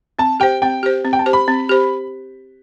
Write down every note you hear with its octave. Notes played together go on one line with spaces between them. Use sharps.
C4 A5
G4 C5 G5
C4 G5
G4 C5
C4
G5
A5
G4 C5
B5
C4
G4 C5